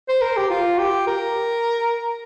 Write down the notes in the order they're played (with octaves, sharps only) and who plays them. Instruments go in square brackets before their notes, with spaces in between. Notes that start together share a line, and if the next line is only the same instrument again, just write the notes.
[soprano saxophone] C5
A#4
G4
F4
G4
A#4